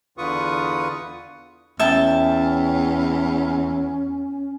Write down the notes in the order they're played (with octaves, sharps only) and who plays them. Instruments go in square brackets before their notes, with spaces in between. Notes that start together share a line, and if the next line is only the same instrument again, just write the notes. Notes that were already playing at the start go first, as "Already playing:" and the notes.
[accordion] E2 D3 F4 B4 C#6 D#6
[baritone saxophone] E2 [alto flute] C#4 [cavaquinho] E5 G5 A5